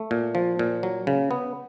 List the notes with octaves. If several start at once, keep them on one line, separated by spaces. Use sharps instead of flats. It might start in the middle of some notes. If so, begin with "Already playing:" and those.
Already playing: A3
A#2
F3
A#2
F#3
C#3
B3